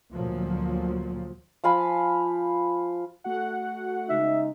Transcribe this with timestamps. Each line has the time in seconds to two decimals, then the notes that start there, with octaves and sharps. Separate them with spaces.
0.12 D2 A#2 F3 F#3
1.64 F3 F5 G#5 B5
3.24 A3 F#4 F#5
4.09 C#3 G#3 D#4 E5